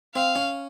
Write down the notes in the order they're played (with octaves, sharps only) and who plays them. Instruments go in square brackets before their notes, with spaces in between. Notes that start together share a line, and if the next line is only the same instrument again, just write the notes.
[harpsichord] C4 [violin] F5
[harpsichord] C#4